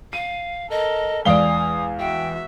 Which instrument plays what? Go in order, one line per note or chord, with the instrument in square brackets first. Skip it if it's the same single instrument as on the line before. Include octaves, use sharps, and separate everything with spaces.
[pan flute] F5 [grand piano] D#7
[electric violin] A4 A#4 [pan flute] D#5
[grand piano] E2 F5 G7 [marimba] G#3 D5 [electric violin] G#5 [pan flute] D#6
[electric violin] F#4 E5 [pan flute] G5